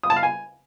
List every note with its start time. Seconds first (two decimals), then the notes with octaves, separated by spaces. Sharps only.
0.03 D#6
0.10 A5
0.16 F5
0.23 G#5